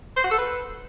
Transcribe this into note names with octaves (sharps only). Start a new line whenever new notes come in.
C5
F#4
A4
B4